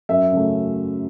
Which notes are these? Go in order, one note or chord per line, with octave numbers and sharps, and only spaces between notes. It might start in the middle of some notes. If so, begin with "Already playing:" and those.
F#2 E5
C#3 F#3 A3